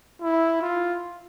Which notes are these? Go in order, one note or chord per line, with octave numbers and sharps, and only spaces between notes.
E4
F4